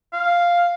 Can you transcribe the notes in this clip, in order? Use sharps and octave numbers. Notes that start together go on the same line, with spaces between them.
F5